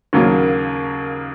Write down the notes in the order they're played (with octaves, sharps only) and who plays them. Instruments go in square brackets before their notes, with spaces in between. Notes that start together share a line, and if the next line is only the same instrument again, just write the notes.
[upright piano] D#2 C#3 F#3 A#3